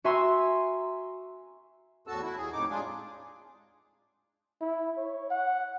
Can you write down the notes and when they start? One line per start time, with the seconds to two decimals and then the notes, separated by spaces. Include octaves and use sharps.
0.04 F#4 E5 G#5 A#5 C6 E6
2.07 E2 A2 F#4 A4 A5 E6
2.22 E4 F#4
2.37 D#2 G#4
2.53 F2 A2 D#4 D6
2.70 G#3 D4 F4 G#4
4.61 E4
4.97 C#5
5.30 F#5